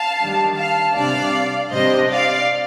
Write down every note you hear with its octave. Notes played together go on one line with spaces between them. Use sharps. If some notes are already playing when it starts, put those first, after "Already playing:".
Already playing: F5 A5
D#3 G3 D4
F5 A5
C3 G3 D4 D5 F5
C3 G3 D4 C5 D#5
D5 F5